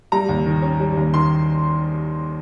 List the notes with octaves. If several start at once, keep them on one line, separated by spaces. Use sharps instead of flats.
G3 A#5
D#2
D#3
C#4
G3
D#2
D#3 C6